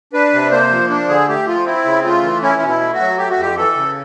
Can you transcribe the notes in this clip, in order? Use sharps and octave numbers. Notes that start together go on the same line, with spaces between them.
D4 B4
C3
A#3 C5
F3
D4
D3 G#4
A3 G4
F3 F4
C4 E4
C#3
A3 F4
E3
C#4 E4
B2
E4
A3
F#4
F#3
A3 G4
F#4
F2 G4
E3 A4
C#3